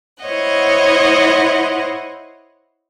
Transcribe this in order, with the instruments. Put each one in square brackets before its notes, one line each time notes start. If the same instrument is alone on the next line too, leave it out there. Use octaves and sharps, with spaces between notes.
[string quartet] E4 C5 C#5 D#5 F#5